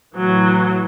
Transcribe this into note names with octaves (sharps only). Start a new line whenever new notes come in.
A2 E3 F#3